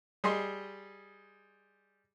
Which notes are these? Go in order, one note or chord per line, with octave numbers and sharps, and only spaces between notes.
G3 G#4 D#5 C6